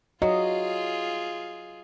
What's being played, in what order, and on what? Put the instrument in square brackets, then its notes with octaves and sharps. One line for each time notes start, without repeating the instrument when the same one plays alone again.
[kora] F#3 [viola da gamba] F4 G#4 [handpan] D#5